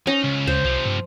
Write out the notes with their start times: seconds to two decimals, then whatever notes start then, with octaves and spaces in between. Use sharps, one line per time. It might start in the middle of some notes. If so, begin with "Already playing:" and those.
0.07 C#4 D#4
0.24 C#2
0.47 D2 C5
0.65 C2 C3 F3
0.86 G2